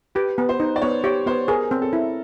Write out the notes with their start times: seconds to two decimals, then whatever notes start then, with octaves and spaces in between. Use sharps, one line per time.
0.15 G4 B4
0.38 B3
0.49 C5
0.60 D#4
0.76 D5
0.82 B3 C#5
1.04 G4 C#5
1.26 B3 C5
1.48 G#4 A#4
1.71 C4
1.82 A4
1.93 E4